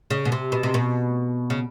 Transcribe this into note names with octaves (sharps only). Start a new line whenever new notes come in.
C#3
B2
C3
B2
C3
B2
C#3